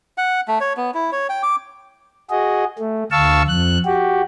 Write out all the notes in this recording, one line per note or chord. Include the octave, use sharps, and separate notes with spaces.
F#5
A3
C#5
B3
E4
C#5
G5
D6
F#4 G#4 D#5
A3
D2 F5 A5 C#6 E6
F2 F#6
F#4 G4